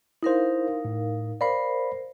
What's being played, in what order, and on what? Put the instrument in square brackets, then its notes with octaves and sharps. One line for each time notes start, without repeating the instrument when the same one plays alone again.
[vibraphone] D#4 A#4 F5 [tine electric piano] E4 C5
[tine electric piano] A2
[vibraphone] A#4 C5 [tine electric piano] D5 F5 B5